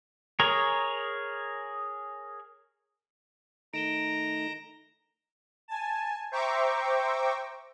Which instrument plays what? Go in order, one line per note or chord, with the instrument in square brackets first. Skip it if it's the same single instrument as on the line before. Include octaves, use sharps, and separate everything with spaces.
[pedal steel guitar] G#4 A#4 C#5
[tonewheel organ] D#3 A3 D#4 [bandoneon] A#5 [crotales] D7 E7 G7
[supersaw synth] G#5 A5
C5 E5 G5 A#5 C#6 D6